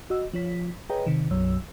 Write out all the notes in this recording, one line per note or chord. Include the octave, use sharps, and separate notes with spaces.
F#4 D#5 E6
F3 F4 C#5 B6
G#4 B4 C#5 D#5 G5 A#5
C3 D#3
B1 F#2 F#3 C#5 E6